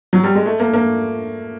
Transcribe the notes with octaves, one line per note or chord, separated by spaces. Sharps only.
F#3
G3
G#3
A3
A#3
A#3